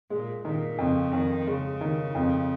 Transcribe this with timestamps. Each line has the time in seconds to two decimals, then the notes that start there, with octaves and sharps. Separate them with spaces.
0.10 A#2 G#3
0.45 A#2 D#3
0.79 F2 C#3
1.13 F2 D#3
1.47 C#3 G#3
1.81 D#3
2.15 F2